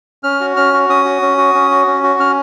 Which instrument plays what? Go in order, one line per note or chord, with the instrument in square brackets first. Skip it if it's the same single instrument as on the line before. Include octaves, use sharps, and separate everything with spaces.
[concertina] C#4 F6
F#4
C#4 F6
F#4
C#4 D#6
F#4
C#4
F#4
C#4
F#4
C#4
F#4
C#4 F6